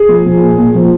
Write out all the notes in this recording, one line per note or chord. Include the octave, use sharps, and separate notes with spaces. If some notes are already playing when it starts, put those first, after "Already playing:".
Already playing: G#4
F3
F3
A#2
A#2
F3